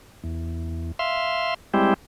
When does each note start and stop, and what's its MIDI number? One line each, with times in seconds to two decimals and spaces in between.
0.24 0.92 40
0.99 1.54 76
0.99 1.54 77
0.99 1.54 84
1.74 1.94 55
1.74 1.94 56
1.74 1.94 60
1.74 1.94 64
1.74 1.94 67